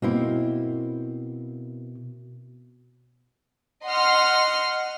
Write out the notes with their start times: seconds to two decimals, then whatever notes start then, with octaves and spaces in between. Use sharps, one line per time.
0.02 B2 A#3 C4 E4
3.85 D#5 F#5 C6 F6